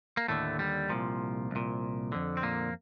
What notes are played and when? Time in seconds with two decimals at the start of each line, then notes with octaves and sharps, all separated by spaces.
0.17 A#3
0.28 D#2 A2 D3 A3
0.59 G3
0.89 C2 A#2 F3
1.51 C2 A#2
2.12 F2 D3
2.37 C4
2.43 A#2 A#3